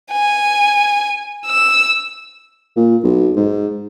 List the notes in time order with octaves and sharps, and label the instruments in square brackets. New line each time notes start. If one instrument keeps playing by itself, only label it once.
[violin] G#5
E6
[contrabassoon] A#2
B1
G#2